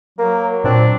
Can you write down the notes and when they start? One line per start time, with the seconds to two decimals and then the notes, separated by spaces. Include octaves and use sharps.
0.19 F#3 A#3 A#4
0.64 A#2 C4 D4